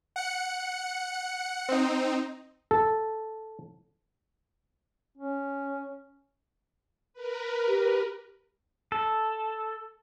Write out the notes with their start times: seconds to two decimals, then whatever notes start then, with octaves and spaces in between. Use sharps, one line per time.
0.16 F#5 C#7
1.69 C4 D#4
2.71 A4
5.17 C#4
7.13 A#4 B4
7.67 G4
8.92 A4